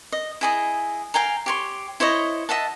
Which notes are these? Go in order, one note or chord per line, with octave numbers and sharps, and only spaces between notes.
D#5
E4 G#4 D#5
F5 G5 G#5 A#5
G4 C#5 C6
E4 C5 C#5 D#5
D#5 E5 F#5 A5